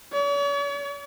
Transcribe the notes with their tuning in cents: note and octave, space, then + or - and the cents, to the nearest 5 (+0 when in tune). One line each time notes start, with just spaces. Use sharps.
C#5 +45